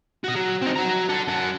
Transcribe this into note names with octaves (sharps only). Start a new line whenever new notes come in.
F#4 D#5
F#3
C4 D#4
F#4 A#5
A4 F#5
F#2 F#5